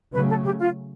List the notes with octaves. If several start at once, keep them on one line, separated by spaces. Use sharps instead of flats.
C#3 F#3 A3 C#4 B4
A4
G4
F4